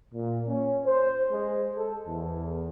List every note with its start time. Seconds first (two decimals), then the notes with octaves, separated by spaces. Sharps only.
0.13 A#2
0.47 C#4
0.85 C5
1.30 G#3
1.76 A4
2.06 E2